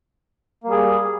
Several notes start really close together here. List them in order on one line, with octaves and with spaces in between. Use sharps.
A#3 G3 G#4